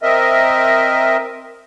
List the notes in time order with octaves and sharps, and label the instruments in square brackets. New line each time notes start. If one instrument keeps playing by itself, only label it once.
[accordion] C4 A#4 D#5 E5